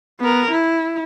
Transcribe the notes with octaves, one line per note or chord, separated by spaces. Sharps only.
B3 A#4
E4